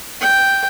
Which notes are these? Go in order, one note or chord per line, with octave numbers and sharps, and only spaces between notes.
G5